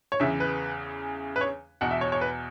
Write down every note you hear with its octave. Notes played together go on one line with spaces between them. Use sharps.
C#5
E2 C#3 E3 E5
B4
B4
C#5
E2 B2 F#5
E5
C#5
C#5
B4